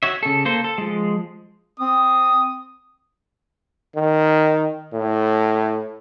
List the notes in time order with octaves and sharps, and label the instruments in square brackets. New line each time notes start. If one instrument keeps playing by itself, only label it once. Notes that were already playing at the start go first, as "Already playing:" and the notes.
[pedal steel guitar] F#4 C#5 E5
C#3 A4
A#3 A4 C5
A4
F3 G#3
[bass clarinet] C4 [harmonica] D#6
[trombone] D#3
A2